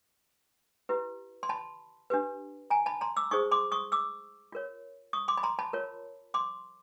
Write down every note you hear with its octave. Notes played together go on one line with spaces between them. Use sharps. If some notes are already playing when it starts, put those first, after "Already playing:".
E4 G4 B4
C6
A5 B5
D4 G4 B4
G#5 A#5
A5 B5
A#5 C6
D6 E6
D#4 G#4 C5 C#6 D#6
C6 D6
C#6 D#6
D6 E6
F4 A#4 C#5
C#6 D#6
C6 D6
B5
A#5 C6
A5 B5
F4 A#4 C#5
C6 D6